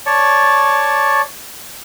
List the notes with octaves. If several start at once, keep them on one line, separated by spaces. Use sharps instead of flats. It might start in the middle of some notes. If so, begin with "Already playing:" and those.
C#5 D5 A5 C#6